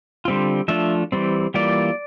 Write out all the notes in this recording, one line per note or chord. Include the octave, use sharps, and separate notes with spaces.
D3 G3 C4 F4
F3 A3 D4 F4 E5
E3 G3 C4
E3 G3 A#3 F4 D5